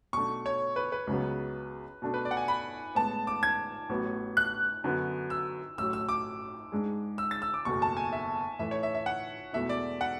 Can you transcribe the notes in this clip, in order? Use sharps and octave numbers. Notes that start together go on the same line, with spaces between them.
B1 B2 A3 D4 C#6
C#5
B4
B4
C#2 C#3 F#3 B3
B2 A3 D4
B4
D5
F#5
G#5
B5
A1 A2 G#3 B3 A5
D6
G#6
A1 A2 F#3 B3 F#4
F#6
F#2 D3 F#3 B3 F#4
E6
A1 A2 F#3 E6
E6
D6
G#2 G#3 D4 G#4
E6
A6
E6
D6
F#1 E2 B2 A3 C#6
A5
G#5
E5
A2 E3 A3 E5
C#5
E5
E5
F#5
E1 E2 B2 A3 E4 E5
D5
F#5